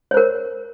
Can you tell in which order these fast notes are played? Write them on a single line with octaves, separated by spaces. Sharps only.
C#5 C5 A#4